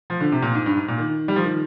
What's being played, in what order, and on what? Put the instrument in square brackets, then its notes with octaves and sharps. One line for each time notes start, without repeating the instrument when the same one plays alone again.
[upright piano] F3
D3
C3
A#2
G#2
G2
G#2
A#2
D#3
G3
F3
D#3